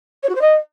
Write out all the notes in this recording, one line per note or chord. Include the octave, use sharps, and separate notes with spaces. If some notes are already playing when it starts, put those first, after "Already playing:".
C#5
F#4
C5
D#5